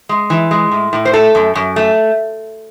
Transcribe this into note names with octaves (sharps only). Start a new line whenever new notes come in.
G#3
E3
G#3
A2
A2
C5
A3 A4
F#2
F#2
A3